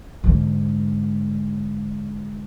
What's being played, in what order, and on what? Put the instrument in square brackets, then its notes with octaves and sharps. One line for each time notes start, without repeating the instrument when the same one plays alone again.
[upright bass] G#2 D3